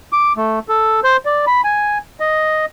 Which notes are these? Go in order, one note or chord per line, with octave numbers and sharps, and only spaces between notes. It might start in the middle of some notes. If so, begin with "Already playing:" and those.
D6
A3
A4
C5
D5
B5
G#5
D#5